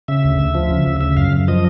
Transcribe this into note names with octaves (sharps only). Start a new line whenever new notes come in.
C#3 E5
D2
D2
F3
C#3
D2
C#3 E5
F#2 F5
F#2
F3 D#5